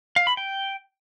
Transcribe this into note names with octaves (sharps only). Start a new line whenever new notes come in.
F5
B5
G5